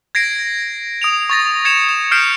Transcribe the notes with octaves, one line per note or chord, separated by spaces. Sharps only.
G#6 A#6 C7 D7
D#6 D7 F7
C#6 A6 A#6
G#6 C#7 E7 F7
E7
D#6 F6 G6 C7 D7 E7